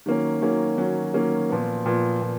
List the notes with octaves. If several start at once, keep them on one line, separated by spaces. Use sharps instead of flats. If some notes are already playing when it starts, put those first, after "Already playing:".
D#3 F#3 A#3 C#4
D#3 F#3 A#3 C#4
D#3 F#3 A#3 C#4
D#3 F#3 A#3 C#4
A#2 F3 B3
A#2 F3 B3
A#2